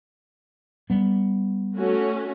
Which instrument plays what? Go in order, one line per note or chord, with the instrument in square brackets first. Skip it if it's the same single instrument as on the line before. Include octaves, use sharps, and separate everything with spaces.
[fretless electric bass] G3 B3
[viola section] A3 C#4 F#4